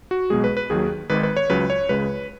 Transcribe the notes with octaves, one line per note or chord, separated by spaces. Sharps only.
F#4
B1 B2 G#3 G#4
B4
B4
D#2 D#3 F#3 G#4
G#1 G#2 D#3 B4
B4
C#5
C#2 C#3 F#3 B4
C#5
C#2 C#3 G#3 B4